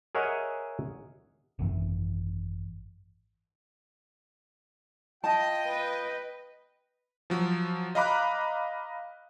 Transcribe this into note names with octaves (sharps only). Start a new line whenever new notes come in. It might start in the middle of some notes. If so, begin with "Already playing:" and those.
G#4 A#4 C#5 D#5 E5 F#5
G#1 F#2 E3
F4 D#5 G5 A5
B4
F3 F#3
D#5 F5 A#5 B5 D6 F#6